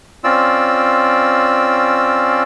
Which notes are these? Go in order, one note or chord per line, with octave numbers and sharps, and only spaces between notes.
C4 C#4 F4 D5 E6